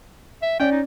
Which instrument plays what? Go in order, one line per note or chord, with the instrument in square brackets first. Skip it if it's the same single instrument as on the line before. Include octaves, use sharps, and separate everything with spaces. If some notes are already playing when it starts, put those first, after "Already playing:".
[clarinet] E5
[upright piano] C#4 D5 [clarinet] G5
[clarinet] D#4